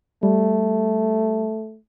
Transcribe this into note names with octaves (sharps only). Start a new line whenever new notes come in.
G3 A3